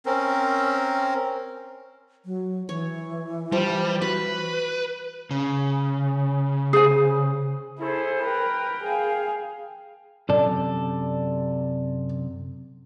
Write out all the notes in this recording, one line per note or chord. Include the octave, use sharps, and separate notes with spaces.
C4 C#4 A#4
F#3
E3 C#5
F3 G3
F#4 B4
C#3
G#4 C5 G#5
E4 G#4 A4 C5
A#4 B4 G5
G#4 F5
F#2 C3 A4 D5